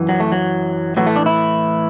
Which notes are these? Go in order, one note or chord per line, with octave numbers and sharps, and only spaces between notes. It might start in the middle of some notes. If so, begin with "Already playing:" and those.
Already playing: F#2 E3
F#3
A3
F#3
A2 E3 F#3
A3
D4
E4